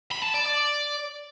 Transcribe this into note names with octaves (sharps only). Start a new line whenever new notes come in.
B5
A5
D5
D5